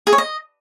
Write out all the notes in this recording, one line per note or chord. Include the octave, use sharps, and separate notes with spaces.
G#4
C#5
D#5